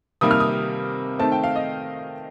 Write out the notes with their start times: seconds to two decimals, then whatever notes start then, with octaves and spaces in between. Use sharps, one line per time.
0.21 C3 D#3 G3 A#3 D#6
0.31 F6
0.40 D#6
1.19 D#3 A3 C4 A5
1.32 G5
1.44 F5
1.56 D#5